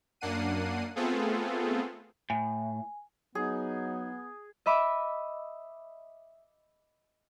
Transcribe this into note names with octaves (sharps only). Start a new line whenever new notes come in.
F#2 A#3 D4 F#5 C7 D#7
A3 B3 C4 F4 G#4 A4
A2 G#5
F#3 B3 D#4 G#4
D#5 E5 B5 D6